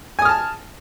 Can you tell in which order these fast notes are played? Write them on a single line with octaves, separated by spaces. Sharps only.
G#5 D#6 F6 A5